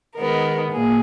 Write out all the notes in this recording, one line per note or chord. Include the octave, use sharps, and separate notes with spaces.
D#3 G#3 B3 A#4
A#2 G#4